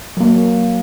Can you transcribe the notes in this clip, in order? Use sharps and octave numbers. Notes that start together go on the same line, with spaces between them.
F#3 A#3